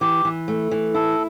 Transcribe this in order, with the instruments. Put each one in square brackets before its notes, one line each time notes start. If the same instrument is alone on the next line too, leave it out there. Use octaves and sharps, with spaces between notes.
[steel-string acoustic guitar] E3 [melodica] G4
[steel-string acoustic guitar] E3
A3
E3
[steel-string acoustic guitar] E4 [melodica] A4